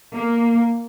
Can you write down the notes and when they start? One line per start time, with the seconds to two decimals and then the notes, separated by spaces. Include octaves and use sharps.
0.15 A#3